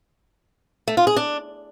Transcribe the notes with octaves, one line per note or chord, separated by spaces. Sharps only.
A3
F4
G#4
D4